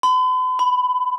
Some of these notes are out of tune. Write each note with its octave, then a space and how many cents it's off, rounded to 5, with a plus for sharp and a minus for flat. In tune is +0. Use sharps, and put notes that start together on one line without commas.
B5 +45
B5 +15